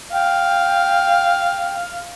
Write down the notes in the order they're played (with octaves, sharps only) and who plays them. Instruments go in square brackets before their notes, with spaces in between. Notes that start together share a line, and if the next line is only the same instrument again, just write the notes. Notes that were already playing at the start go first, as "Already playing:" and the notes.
[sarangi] F5 [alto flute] G5